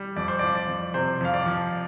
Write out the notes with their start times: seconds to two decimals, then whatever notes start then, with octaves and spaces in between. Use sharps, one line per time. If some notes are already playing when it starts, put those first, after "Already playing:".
Already playing: G3
0.16 F2 D5
0.28 C5
0.39 D5
0.43 F3
0.55 D5
0.68 F2
0.94 C3 C5
1.21 F2 F5
1.34 D5
1.46 F3